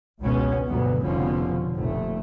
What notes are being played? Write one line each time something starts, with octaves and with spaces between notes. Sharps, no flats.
G#1 C#2 B2 B3 C#4
D2 G2 B2 F#3 B3
F1 B2 D3 F3 C#4
F1 A#1 A3